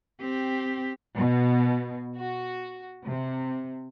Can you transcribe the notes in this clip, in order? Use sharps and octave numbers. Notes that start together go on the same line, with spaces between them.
C4 G4
B2
F#4
C3